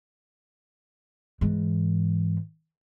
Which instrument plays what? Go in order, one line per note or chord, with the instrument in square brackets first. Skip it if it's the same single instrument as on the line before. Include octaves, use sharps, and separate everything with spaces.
[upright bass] G#2 E3